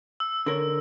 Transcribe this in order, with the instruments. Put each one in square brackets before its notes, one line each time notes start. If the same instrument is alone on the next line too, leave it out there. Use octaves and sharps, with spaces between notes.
[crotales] E6
[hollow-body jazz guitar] D3 A#4 C#5